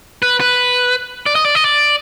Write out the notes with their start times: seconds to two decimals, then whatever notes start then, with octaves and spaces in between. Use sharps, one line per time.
0.22 B4
0.40 B4
1.26 D5
1.35 D#5
1.45 D5
1.55 D#5
1.64 D5